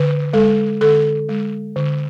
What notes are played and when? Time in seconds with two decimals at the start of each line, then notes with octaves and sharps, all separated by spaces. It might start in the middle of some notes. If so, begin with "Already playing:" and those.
Already playing: D3 B4
0.33 G#3 A4
0.81 D3 A4
1.29 G#3
1.76 D3